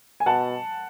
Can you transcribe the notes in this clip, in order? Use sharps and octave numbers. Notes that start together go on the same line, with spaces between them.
G#5
B2 F#5 A5